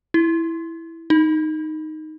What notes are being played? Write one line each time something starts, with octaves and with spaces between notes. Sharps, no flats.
E4
D#4